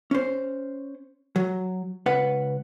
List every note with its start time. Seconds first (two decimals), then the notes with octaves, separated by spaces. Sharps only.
0.11 C#4 C5
1.36 F#3
2.06 C#2 B4 F#5